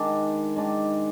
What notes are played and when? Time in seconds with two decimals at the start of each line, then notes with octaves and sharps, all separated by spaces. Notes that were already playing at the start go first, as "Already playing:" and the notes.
Already playing: D#3 G#3 D4
0.56 D#3 G#3 D4